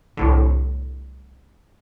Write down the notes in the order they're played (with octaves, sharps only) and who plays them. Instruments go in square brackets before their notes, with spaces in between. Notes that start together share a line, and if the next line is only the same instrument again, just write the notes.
[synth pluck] C2 A2 D3